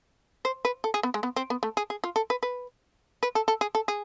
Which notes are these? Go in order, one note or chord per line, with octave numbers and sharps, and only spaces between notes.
C5
B4
A4
G#4
B3
G#3
B3
C4
B3
A3
G#4
G#4
F4
A4
B4
B4
B4
A4
A4
G#4
A4
G#4